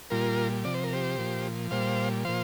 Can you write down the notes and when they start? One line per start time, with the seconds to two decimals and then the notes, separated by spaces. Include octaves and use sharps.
0.10 A#2 G3 F4 A#4
0.64 C3 F3 D5
0.74 C5
0.84 A#4
0.93 G4 C5
1.18 A#2 F3
1.71 A#2 G3 C5 F5
2.25 A#2 F3 C5 F5